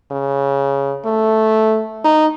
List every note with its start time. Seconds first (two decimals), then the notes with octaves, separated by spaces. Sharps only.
0.12 C#3
1.05 A3
2.05 D#4